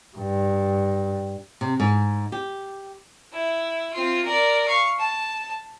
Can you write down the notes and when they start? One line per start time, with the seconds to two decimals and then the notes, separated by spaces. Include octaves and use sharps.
0.17 G2
1.61 C3
1.80 G#2
2.32 G4
3.33 E4
3.93 C4 F4
4.25 A#4 D5
4.67 F5 C#6
4.99 A5